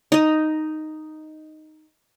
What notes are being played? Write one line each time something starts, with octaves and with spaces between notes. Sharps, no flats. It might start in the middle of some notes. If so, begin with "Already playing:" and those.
D#4 D#5